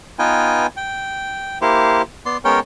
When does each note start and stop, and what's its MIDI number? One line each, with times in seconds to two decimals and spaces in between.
0.19 0.67 59
0.19 0.67 63
0.19 0.67 65
0.19 0.67 71
0.19 0.67 79
0.19 0.67 80
0.77 1.58 79
1.61 2.02 58
1.61 2.02 64
1.61 2.02 67
1.61 2.02 72
2.26 2.37 59
2.26 2.37 74
2.26 2.37 84
2.45 2.60 56
2.45 2.60 59
2.45 2.60 61
2.45 2.60 70
2.45 2.60 73
2.45 2.60 79